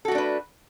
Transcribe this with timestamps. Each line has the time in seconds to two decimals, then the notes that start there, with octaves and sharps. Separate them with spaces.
0.05 A4
0.08 F#4
0.11 A3
0.15 D4
0.18 B4